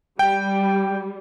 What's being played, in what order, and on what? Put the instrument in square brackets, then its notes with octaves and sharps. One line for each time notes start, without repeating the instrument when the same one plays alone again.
[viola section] G3 [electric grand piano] G5